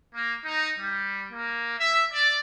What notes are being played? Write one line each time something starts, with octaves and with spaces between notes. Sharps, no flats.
A#3
D#4
G3
A#3
E5
D5